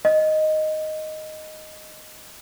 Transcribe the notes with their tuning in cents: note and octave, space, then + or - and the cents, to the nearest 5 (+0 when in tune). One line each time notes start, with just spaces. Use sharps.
D#5 +0